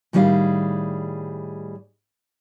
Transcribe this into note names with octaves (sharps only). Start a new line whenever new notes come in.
A2 D#3 G3 G#4 F5